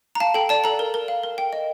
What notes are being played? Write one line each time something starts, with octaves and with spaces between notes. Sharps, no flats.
A#5
F5 A5
A4 G5
D5 A5
A4 A#5
A#4
A#4
F5
A#4
G5
D#5